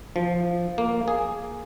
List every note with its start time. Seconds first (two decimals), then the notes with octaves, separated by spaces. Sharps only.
0.16 F3
0.78 A#3
1.08 G#4